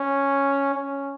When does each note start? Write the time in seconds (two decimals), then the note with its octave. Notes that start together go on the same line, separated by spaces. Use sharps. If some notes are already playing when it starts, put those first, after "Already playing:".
Already playing: C#4
0.74 C#4